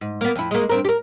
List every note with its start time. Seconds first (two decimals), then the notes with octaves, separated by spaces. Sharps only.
0.01 G#2
0.21 A#3 B3
0.35 F2 E4
0.51 G#3 A#3
0.69 G2 C4 A#4
0.85 G4 A#4